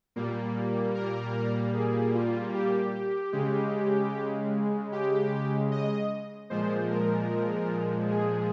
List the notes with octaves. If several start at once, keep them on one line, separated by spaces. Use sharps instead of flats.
A#2 G3 A#3
A#4
G#4
F4
G4
C#3 G#3
G4
D#5
A#2 F3 G#3 C5
A#4
G#4